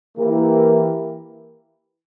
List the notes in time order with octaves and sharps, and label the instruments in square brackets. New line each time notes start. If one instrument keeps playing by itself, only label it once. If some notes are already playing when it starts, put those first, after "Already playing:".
[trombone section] E3 A#3 E4 G4 A#4